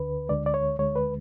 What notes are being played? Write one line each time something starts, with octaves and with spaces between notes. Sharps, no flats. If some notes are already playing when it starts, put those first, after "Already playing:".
Already playing: D2 D3 B4
D2 D3 G#3 D5
D5
C#5
D2 D3 G#3 C#5
B4